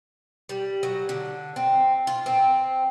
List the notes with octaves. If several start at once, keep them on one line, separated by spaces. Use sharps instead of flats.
G3
F#3
D3
C4
F4
C4